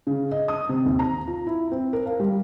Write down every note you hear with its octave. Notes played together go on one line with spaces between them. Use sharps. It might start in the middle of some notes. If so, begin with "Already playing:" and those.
C#3
D#5
D#6
C3
D#2
A#5
F4
E4
C4
A#4
F5
G3